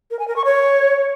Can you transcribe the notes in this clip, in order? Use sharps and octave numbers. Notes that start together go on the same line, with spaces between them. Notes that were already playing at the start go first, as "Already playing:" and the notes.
A#4
G#5
A#4
C#6
C#5